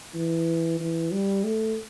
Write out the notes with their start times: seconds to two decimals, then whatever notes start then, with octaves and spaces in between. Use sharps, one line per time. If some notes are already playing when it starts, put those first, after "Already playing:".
0.14 E3
0.80 E3
1.12 G3
1.44 A3